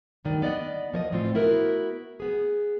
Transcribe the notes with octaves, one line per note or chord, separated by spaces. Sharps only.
D2 G2 D#3 D5
B3 D5 D#5 F#5
A#2 F3 C#5 D#5
A2 E3 C4 F4
B3 E4 F#4 A#4 B4
B3 G#4